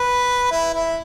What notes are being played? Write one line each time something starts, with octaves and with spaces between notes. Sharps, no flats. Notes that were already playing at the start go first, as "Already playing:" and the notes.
Already playing: B4
E4
E4